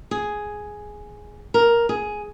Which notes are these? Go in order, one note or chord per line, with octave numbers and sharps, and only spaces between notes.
G#4
A#4
G#4